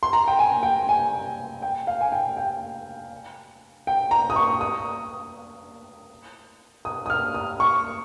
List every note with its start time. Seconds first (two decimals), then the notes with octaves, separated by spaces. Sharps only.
0.03 C6
0.13 A#5
0.28 G5
0.39 G#5
0.63 G5
0.89 G#5
1.62 G5
1.87 F5
2.01 G#5
2.12 G5
2.37 G5
3.87 G5
4.11 A#5
4.30 D#6
4.36 C#6
4.61 D#6
6.85 D#6
7.06 D#6
7.10 F6
7.34 D#6
7.60 C#6